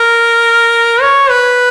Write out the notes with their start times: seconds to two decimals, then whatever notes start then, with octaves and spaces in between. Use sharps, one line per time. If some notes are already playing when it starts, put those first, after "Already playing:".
Already playing: A#4
1.01 C#5
1.30 B4